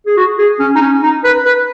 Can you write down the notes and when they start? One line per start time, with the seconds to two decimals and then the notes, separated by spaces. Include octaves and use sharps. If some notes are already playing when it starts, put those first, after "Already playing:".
0.07 G#4
0.17 F#4
0.39 G#4
0.60 C#4
0.76 D#4
0.81 C#4
1.03 D#4
1.25 B4
1.45 B4